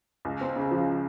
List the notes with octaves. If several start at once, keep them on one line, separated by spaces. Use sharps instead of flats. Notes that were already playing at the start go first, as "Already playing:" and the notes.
C#2
C4
C#3
F3